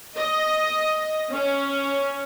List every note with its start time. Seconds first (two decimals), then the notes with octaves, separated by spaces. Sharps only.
0.17 D#5
1.33 C#4